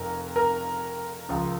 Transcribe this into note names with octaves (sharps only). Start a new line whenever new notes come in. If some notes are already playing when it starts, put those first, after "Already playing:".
Already playing: F1 F2 A#4
A#4
C#2 C#3 F3